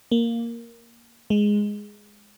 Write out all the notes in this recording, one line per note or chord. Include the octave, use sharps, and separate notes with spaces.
A#3
G#3